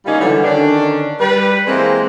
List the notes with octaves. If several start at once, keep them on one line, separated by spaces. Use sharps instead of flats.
C#3 G3 A#3 C#4 D#4 F4
D3 E3 F#3 G3 B3
D3 D#3 C#4 D4
G3 B4
E3 G#3 A#3 C4